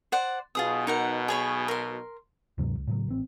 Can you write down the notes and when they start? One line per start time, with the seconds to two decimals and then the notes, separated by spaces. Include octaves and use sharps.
0.12 C5 D5 F#5
0.55 B1 B2 F4 G#4 D#6
0.87 D#4 A#4 F#5
1.28 G#4 C#5 B5
1.68 A#4 C6
2.58 D2 G2 C3 F#3
2.75 C#2
2.87 A2 C#3 F#3
3.09 A1 C4